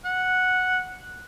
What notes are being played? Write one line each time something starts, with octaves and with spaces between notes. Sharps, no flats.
F#5